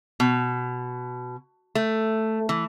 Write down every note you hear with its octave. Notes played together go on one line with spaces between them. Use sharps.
B2
A3
E3